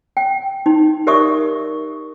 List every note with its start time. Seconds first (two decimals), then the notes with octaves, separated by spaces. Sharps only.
0.17 G5
0.66 D#4
1.07 G4 A#4 D5 E5 C#6 D#6